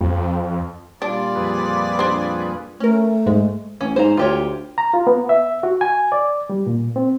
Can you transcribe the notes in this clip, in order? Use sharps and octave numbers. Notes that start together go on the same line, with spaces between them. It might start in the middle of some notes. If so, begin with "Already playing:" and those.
F2
A#2 G3 D4 F4 D5
F2 G#4 B4
D4 C5
A3 C#4 A#4
G#2 G#3
A1 C#4
G#2 C5 A#5
D2 F4 G4 C#5
A#5
F4
B3
E5
F#4
G#5
D5
G3
A#2
C4